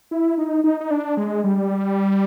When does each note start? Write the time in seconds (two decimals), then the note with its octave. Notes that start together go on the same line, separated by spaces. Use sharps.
0.11 E4
0.38 D#4
0.64 D#4
0.80 D#4
0.91 D4
1.17 G#3
1.44 G3